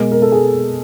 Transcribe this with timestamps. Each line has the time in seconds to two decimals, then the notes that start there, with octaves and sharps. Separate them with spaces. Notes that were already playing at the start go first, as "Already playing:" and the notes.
Already playing: B2 G#3 A#4
0.12 A#4
0.22 A4
0.32 G#4